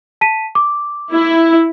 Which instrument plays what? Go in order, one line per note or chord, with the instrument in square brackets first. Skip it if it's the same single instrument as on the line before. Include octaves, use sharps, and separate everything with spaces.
[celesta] A5 B6 D#7
D6
[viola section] E4